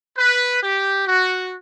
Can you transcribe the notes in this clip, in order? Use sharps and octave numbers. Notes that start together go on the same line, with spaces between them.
B4
G4
F#4